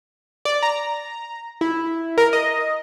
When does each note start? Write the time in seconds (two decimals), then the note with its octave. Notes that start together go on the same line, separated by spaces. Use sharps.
0.45 D5
0.63 A#5
1.61 E4
2.18 A#4
2.33 D#5